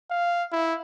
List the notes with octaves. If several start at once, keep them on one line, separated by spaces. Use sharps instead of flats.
F5
E4